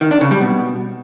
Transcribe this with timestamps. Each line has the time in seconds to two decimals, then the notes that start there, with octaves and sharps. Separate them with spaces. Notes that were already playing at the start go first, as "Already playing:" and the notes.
0.01 D#3
0.11 D4
0.21 C#3
0.31 G3
0.41 B2